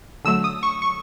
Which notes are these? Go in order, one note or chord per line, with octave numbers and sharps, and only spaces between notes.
D3 F#3 A3 E6
D#6
C#6
C#6